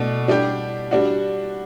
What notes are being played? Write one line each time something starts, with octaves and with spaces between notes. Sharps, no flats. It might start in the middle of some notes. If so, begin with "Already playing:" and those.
Already playing: B2 A3 D4
G3 D4 G4
G3 D4 F#4